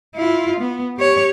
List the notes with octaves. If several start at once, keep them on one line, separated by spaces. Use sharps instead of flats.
E4 F4
B3
G4 C#5